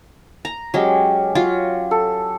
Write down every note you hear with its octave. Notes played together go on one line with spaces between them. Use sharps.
A#5
F#3 G#3 C#4 G4
F#3 F4
A4